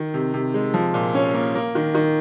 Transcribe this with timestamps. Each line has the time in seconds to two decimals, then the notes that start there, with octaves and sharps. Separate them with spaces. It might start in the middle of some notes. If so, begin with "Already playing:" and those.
Already playing: D#3
0.14 C3
0.34 C3
0.54 G#3
0.74 F3
0.94 A#2
1.14 C#4
1.34 A#3
1.55 A#3
1.75 D#3
1.94 D#3